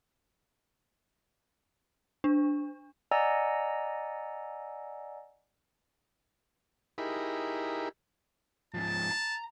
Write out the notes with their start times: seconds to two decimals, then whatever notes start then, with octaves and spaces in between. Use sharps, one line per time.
2.24 D4
3.11 D5 D#5 F#5 G#5 A#5 E6
6.98 D#4 E4 G4 G#4 A#4 B5
8.74 G#2 F3 A5
9.10 A#5